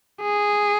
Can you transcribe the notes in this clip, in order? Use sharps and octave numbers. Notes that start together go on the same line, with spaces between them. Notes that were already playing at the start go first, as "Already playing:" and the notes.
G#4